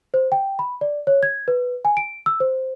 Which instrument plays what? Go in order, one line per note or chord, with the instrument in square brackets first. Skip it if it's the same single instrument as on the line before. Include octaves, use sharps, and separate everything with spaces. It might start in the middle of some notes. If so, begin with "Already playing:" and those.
[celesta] C5
G5
B5
D5
C#5
G#6
B4
G#5
D7
E6
C5